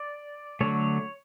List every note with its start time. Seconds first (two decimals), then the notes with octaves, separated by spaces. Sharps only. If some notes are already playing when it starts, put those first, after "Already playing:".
Already playing: D5
0.61 D3 F#3 A3 C#5